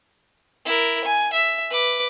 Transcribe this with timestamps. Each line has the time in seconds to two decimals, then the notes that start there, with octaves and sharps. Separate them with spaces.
0.66 E4 A#4
1.05 G#5
1.33 E5
1.71 B4 D6